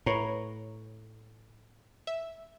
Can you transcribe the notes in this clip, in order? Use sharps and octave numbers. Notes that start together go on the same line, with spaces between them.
A2 B4 C#5 A#5
E5 E6